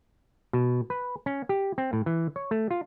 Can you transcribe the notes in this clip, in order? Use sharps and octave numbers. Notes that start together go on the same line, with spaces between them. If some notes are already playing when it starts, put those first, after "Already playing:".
B2
B4
C#4
G4
C4
A2
E3
C#5
A3
F4